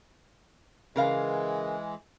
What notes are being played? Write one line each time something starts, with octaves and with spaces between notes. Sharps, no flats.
C#3 E3 G#3 A#4 F5